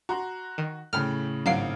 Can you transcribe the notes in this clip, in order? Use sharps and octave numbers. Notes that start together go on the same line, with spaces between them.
F#4 A#5 C6 F#6
D#3
A2 C#3 A4 G5 B5 F6
G#1 F#3 F5 C7 D7